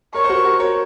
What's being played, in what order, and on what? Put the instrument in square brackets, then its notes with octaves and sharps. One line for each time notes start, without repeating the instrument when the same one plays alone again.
[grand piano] A#4 C#5 [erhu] C#6
[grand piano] C5
F#4 A#4
F#4 A#4
A#4 C#5